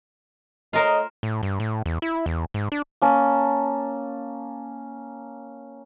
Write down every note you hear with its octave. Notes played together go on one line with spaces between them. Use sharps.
A3 F4 A#4 C5 C#5 D#5
A2
G2
A2
E2
E4
E2
G#2
D4
A#3 C#4 A5